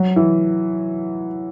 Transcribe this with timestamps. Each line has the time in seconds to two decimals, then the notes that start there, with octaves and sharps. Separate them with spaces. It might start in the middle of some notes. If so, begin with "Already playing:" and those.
Already playing: F#3
0.16 E3